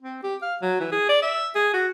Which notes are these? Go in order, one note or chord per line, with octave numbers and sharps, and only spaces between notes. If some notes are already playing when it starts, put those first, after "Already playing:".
C4
G4
F5
F#3
E3
G#4
D5
E5
G#4
F#4